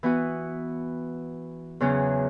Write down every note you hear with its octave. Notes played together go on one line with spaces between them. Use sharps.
E3 B3 F#4
E2 C#3 F#3 C#4